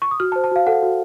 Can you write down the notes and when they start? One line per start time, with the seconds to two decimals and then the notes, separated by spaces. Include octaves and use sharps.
0.02 C#6
0.11 D#6
0.20 F#4 F6
0.32 A5
0.36 C5
0.44 A5
0.51 F#4 F5
0.67 A4 F#5
0.83 F#4